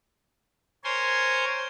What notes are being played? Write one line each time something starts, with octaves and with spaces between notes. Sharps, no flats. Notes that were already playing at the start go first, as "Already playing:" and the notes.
A#4 C5 C#5 G#5 C6